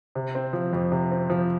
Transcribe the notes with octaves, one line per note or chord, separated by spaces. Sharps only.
C3
C4
F3
F2
C3
C4
F3